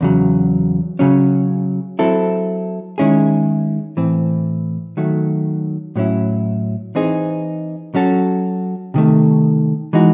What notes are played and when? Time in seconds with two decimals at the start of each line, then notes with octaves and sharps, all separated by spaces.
0.01 E2 C#3 F#3
0.99 C#3 F#3 C#4
1.99 F#3 C4 E4 A4
2.98 D#3 G#3 C#4 E4 G#4
3.97 A2 E3 C4
4.97 D#3 F#3 A3
5.96 A2 F#3 C#4 E4
6.95 E3 C4 D#4 G#4
7.95 F#3 C#4 F#4 A4
8.94 C3 D#3 A3
9.93 E3 G#3 D#4 F#4